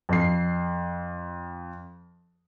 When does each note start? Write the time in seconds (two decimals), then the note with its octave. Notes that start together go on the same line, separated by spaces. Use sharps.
0.09 F2 C7